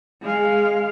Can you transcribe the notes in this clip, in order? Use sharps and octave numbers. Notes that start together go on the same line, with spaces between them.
G#3 F5